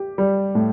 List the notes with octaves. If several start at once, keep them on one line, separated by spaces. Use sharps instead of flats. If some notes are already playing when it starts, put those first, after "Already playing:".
Already playing: G4
G3
A2